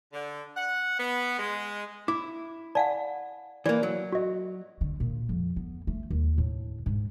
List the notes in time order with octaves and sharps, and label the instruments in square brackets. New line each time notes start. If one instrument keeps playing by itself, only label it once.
[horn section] D3
F#5
B3
G#3
[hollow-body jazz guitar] E4 [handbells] D6
[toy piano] D5 F5 F#5 [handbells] G#5 A5
[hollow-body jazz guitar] E3 A#3 [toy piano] D5
[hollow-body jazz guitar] F#3
[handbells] F#4 D#5
[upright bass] D3
A#2
F2
B3
A3
D#2
A2
G#2